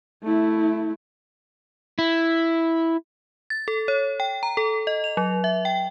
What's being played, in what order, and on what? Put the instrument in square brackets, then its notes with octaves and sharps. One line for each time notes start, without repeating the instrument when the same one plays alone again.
[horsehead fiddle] A3 E4
[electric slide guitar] E4
[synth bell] A6
A4
C#5
G5
A#5
A4
D#5
F7
F#3
E5
G5